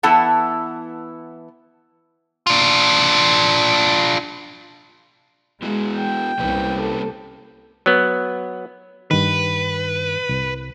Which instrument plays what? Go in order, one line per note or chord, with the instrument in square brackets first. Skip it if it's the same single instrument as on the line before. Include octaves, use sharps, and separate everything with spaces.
[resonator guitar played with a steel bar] E3 B3 E4 A4 F#5 A5
[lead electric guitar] D4 F4
[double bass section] G#3 [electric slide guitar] B3 E4 F#4
[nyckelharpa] G5
[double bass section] C2 [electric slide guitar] A#3 C#4 B4
[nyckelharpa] A4
[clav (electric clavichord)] F#3 B3
[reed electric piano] G2 D#3 [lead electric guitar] B4
[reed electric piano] C2